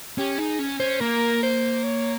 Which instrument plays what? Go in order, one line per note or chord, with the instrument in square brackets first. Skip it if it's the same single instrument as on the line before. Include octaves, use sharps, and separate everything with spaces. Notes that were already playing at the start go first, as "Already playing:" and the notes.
[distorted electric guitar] C#4 [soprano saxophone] G4
[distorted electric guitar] D#4 [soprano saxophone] G#4
[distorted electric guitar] C#4
[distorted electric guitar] C#4 [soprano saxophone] C5
[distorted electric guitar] A#3 [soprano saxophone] A#4
[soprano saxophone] C5
C#5